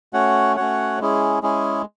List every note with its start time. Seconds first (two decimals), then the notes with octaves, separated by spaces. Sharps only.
0.13 A3 C#4 F#4 C#5 F#5
0.56 A3 C#4 F#4 C#5 F#5
0.99 G#3 C#4 E4 G#4
1.42 G#3 C#4 E4 G#4